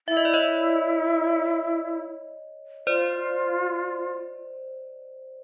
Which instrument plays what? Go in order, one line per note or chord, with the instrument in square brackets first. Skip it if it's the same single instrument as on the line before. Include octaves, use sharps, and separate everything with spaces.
[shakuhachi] E4 [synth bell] E5
[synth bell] D#5
D5
C#5 D#5
[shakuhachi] F4 [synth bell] C5 D5